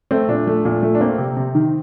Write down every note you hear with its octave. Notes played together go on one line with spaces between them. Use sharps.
A3 C4
A#2 D4
A3
A#2
A3
D4
A#3 C4
C3
C3
D#3